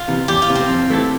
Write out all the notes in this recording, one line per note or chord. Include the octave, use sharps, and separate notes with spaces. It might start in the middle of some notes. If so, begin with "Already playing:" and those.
Already playing: F4
C3 E3
E2 G4
F4
C3 E3
C4
F2
E3 A3 E4 A4